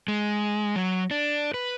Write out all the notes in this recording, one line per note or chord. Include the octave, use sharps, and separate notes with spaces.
G#3
F#3
D4
B4